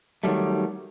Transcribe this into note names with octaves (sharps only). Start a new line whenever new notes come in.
D#3 F#3 G3 A3